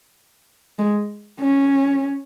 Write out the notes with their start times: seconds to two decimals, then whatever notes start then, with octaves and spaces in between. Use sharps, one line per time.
0.79 G#3
1.40 C#4